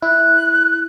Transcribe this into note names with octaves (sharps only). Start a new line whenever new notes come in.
E4 F#6